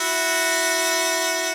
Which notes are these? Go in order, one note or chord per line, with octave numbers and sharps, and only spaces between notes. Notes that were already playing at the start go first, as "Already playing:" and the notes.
Already playing: E4 F#4